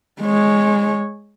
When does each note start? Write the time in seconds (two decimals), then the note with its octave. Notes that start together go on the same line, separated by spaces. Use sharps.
0.21 G#3 C#5